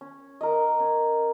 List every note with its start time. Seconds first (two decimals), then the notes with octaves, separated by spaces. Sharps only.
0.01 C#4
0.41 A#4 D#5
0.80 C#4